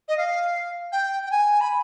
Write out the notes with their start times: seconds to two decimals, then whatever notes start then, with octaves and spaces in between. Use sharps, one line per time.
0.08 D#5
0.17 F5
0.92 G5
1.26 G5
1.31 G#5
1.60 B5